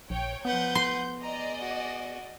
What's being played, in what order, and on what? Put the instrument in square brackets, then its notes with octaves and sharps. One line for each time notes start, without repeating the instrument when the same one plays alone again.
[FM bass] A#1 [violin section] C#5 G5
[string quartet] F3 B4 F#5 [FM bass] B3 [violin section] G6
[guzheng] C6
[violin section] G#4 D5 D#5 [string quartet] A#5
[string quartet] F#4